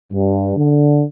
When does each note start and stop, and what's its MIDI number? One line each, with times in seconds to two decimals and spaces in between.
0.12 0.54 43
0.56 1.02 50